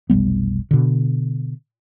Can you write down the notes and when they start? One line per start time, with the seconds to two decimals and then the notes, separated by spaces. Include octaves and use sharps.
0.10 F1 B1 G3 B3
0.71 B2 D3